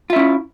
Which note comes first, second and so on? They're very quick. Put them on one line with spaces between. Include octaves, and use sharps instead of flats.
F4 E5 C#4 E4